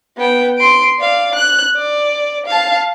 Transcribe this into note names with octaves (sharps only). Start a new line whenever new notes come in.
B3 G5
C6 D7
D5 F5
F#6
D5
F5 A5